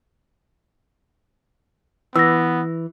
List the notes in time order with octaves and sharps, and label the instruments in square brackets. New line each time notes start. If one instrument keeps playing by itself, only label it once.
[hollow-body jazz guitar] E3 [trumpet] B3 [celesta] E6 A#6